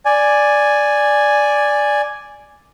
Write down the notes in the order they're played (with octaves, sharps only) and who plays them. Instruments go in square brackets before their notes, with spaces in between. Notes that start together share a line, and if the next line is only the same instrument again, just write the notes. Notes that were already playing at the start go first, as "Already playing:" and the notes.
[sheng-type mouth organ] D5 G#5